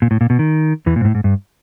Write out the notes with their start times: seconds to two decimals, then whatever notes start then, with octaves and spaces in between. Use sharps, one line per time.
0.02 A#2
0.11 A2
0.21 A#2
0.30 B2
0.39 D#3
0.86 E2 E3
0.96 A#2
1.01 G#2
1.05 A2
1.15 G#2
1.24 G2